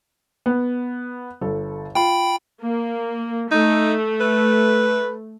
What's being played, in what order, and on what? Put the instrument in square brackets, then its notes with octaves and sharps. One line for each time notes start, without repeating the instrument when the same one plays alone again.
[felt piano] B3
G1 A4
[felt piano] F4 [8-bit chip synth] G5 B5
[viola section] A#3
[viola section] A3 [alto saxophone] D#4
[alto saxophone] B4